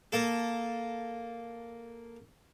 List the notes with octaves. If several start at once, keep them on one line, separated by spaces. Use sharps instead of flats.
A#3 A4